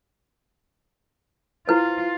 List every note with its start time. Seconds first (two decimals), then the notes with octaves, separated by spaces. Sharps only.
1.67 E4 F4 B4 C5